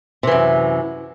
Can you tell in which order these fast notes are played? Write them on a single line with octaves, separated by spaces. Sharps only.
C3 E3 F#2